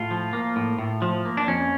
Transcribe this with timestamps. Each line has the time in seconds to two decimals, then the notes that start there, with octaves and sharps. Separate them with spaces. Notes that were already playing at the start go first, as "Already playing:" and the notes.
Already playing: A2 F4
0.11 F3
0.33 A#3
0.56 A2
0.79 A2
1.02 F3
1.25 A#3
1.37 D4
1.47 F2 C#4